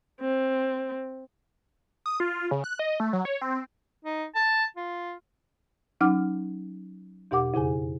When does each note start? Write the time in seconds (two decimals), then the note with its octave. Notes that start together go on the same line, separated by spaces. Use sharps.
0.21 C4
2.06 D#6
2.20 F4
2.51 C#3
2.64 F#6
2.79 D#5
3.00 A3
3.13 F#3
3.25 C#5
3.41 C4
4.05 D#4
4.35 A5
4.76 F4
6.01 F#3 C#4 D#4 F#5 D6 F6
7.31 E2 B2 G4 F#5 D6
7.54 F2 C#3 G#4 G#5